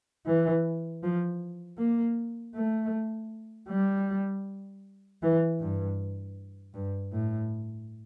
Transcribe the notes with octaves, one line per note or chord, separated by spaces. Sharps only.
E3
F3
A#3
A3
G3
E3
G2
G2
A2